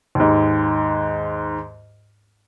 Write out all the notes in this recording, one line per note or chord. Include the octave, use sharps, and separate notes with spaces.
D#2 G#2